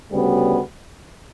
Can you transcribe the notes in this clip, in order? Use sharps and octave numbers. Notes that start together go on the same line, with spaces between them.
D2 C#3 G3 B3 F#4